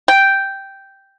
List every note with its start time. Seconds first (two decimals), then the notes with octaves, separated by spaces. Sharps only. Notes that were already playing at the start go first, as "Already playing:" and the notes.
0.08 G5